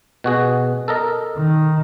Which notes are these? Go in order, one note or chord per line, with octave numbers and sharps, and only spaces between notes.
B2 F#4 G#4
A4 A#4 D#5
D#3